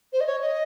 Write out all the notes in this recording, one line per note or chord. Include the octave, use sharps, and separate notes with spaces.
C5
D#5
C#5
D#5